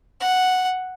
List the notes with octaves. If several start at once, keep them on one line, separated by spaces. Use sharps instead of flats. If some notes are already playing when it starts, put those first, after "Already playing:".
F#5